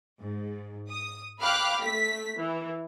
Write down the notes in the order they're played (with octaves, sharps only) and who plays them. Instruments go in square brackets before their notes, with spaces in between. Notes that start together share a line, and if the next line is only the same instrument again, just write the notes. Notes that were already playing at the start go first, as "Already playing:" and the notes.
[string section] G#2
D#6
F5 G5 B5 D6 F6 F#6
A3 B6
E3